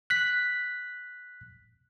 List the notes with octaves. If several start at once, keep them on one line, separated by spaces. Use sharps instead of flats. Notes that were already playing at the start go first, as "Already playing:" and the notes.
F#6 B6